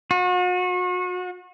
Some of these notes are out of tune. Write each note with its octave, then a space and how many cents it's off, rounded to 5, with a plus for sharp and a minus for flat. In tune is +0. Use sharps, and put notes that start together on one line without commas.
F#4 -40